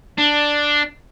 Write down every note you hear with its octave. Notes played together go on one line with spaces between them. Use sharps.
D4